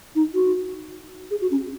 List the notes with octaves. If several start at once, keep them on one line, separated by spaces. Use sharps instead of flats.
D#4
F#4
G#4
F#4
C#4